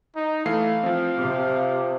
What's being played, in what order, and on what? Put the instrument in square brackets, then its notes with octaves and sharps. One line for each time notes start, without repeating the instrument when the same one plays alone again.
[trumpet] D#4
[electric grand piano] E3 A3 C7 [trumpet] F5
[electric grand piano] F3 C4
[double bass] C3